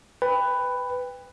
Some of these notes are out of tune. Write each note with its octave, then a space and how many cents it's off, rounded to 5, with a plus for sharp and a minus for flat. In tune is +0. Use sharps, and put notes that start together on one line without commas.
B4 +10 G5 +25